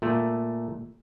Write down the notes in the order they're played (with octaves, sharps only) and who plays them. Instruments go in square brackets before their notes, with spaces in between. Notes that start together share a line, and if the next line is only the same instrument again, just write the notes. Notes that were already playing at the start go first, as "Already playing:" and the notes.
[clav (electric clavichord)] A#2 A3